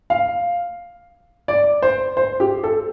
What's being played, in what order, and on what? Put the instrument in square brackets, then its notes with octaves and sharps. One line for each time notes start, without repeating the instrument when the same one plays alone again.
[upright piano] F5
D5
C5
C5
G4
A4